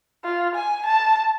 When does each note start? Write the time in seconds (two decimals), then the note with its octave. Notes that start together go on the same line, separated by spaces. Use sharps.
0.24 F4
0.55 G#5
0.86 A5